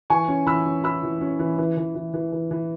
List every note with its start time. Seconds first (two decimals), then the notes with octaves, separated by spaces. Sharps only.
0.10 E3 G#5 C#6
0.28 C#4
0.47 E3 B5 E6
0.66 C#4
0.84 E4 B5 E6
1.03 E3
1.21 C#4
1.39 E3
1.58 E3
1.77 E3
1.95 E3
2.14 E3
2.32 E3
2.51 E3